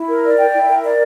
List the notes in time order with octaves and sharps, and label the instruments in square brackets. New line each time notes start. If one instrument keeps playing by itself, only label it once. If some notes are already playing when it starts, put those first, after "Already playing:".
Already playing: [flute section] E4
A#4
D5
G5
E4
A#4
D5